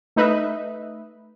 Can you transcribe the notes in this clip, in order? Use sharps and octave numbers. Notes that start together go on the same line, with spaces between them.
A3 D#4 B4 D#5 E5